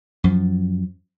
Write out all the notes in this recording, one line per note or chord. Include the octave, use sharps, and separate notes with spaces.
F#2 F3